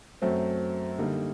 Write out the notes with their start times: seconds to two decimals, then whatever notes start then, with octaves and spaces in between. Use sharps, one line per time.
0.22 F#2 F#3 A3 C4
0.98 D3 G3 A#3 D#4